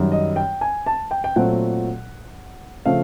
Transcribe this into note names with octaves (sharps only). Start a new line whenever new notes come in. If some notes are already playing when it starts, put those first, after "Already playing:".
Already playing: F#2 D#3 G3
D#5
G5
G#5
A5
G5
G5
A#2 F#3 A3 C4 F#5
C#3 F3 A3 C4 F5